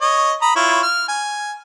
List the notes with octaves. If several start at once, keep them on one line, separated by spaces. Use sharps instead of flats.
C#5 D#5
A#5 B5 D#6
E4 F4 C#5
F6
G#5